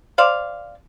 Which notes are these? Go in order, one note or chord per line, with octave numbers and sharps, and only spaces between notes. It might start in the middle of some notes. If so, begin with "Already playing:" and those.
C5 D5 F5